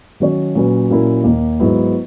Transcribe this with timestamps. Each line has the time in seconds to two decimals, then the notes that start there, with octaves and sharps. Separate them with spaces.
0.20 D#3 F#3 C#4 F#4 C#5
0.55 A#2 F#3 C#4 F#4 B4
0.90 A#2 F#3 C#4 E4 A#4
1.24 D#2 D#3 A#3
1.60 G#2 F#3 B3 E4